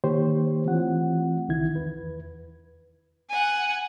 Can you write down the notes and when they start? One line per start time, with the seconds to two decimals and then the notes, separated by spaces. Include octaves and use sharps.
0.04 D#3 A#3 G4 C5 C#5
0.65 E3 A3 C4 F4 F#5
1.48 C2 D#3 E4 G#6
1.75 E2 B4
3.30 F#5 G#5